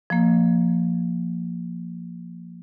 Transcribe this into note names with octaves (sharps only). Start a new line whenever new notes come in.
F3 A#3